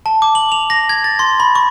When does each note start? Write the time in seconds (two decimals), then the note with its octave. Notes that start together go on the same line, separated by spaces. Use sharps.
0.06 A5
0.22 D6
0.35 F#7
0.52 F7
0.70 A#6
0.89 G#6
1.04 A6
1.19 C6
1.40 B5
1.55 C#6